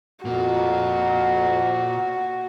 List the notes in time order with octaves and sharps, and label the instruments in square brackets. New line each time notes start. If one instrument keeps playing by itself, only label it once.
[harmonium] F2 [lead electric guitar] A#2 A#3 [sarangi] F#4